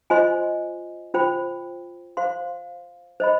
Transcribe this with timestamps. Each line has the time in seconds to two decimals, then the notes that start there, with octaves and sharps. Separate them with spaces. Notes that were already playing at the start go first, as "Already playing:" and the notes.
0.10 F4 C5 D#5 G#5 C6
1.14 F4 C5 G5 B5
2.17 C5 F5 C6
3.20 C5 D#5 B5